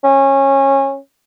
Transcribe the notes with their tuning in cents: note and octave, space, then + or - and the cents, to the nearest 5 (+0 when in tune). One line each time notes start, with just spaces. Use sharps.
C#4 -20